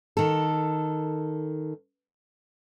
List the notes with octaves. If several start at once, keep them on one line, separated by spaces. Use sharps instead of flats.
D#3 A4